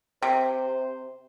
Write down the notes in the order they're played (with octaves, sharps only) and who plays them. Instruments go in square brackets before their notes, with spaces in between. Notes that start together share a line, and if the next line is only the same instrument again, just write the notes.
[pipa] C3 [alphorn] C5